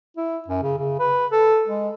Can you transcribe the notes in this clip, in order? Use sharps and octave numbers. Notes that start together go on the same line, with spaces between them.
E4
F#2
C#3
C#3
B4
A4
G#3